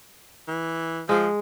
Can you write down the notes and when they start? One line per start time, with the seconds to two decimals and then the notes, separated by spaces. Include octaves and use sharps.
0.48 E3
1.09 F3 G#3